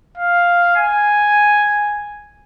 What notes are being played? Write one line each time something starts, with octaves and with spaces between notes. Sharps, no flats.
F5
G#5